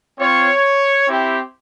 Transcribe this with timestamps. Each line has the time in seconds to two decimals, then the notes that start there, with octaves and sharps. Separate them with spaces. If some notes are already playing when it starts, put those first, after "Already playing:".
0.18 C4 F4 C#5
1.08 C4 E4 G4